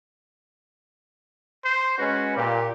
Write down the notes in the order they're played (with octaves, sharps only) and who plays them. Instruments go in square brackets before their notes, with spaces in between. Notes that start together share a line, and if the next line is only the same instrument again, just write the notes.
[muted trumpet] C5
[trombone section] G#3 C#4 B4 [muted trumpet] F#4
[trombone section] A#2 [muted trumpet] G4